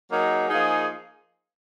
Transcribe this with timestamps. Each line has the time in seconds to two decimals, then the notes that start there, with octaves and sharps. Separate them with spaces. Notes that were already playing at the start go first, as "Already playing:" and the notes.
0.11 F#3 A#3 D#4 G#4
0.49 F3 A#3 D#4 G#4